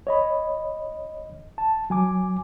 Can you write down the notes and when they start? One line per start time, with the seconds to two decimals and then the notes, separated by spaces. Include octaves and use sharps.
0.07 C#5 D#5 B5
1.58 A5
1.90 F#3 G#5 D6